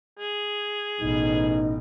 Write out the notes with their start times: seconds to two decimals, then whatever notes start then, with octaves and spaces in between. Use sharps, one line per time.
0.19 G#4
1.00 A1 B2 D#4